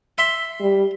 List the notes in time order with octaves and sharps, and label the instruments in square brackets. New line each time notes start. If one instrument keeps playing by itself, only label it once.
[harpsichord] E5 C6
[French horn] G3